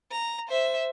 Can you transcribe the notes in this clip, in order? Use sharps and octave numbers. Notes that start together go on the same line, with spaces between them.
A#5
C5 E5